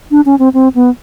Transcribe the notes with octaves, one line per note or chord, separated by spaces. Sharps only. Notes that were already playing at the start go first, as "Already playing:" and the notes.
D4
C#4
C4
C4
B3